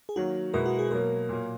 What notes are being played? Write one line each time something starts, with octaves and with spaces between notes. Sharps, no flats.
G#4
D#3 F#3 A#3 F#4
B2 G#3 B3 E4 A#4
F#4
G#4
B2 F#3 A#3 A#4
A#2 F#3 A#3